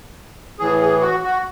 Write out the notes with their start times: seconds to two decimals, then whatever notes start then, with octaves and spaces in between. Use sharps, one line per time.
0.59 A2 E3 G#4
0.81 G#4
1.01 F#4
1.24 F#4